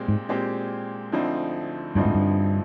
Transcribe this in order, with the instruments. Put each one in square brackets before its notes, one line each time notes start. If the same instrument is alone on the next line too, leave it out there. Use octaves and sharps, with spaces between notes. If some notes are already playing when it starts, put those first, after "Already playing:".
Already playing: [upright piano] A#2 G#3 C4 G4
[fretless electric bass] G#2
[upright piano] A#2 G#3 C4 G4
D2 D3 F3 C4 D#4
[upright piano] D2 D3 F3 C4 D#4 [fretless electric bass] G2
[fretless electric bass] G#2
G2